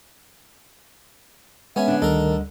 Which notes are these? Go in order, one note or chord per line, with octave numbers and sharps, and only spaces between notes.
G#3 B3 C#4 E5 G#5
D3 D4
D2 D#3 G3 A4 A#4 D#5